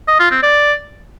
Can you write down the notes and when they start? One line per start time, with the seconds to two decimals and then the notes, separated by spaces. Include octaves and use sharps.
0.08 D#5
0.20 F4
0.31 C4
0.43 D5